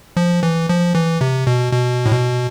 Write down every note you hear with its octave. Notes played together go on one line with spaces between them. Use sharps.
F3
E3
F3
E3
C3
B2
B2
A2
B2